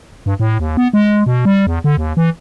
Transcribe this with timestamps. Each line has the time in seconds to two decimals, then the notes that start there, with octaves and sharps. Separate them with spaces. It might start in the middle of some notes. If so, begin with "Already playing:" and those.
0.26 G2
0.40 A2
0.60 D#2
0.77 B3
0.93 G#3
1.26 B2
1.45 G3
1.67 E2
1.84 D3
1.97 D#2
2.17 E3